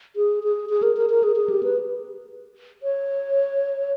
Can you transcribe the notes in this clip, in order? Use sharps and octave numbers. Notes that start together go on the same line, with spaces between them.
G#4
G#4
G#4
A#4
A#4
A#4
G#4
G#4
G4
B4
C#5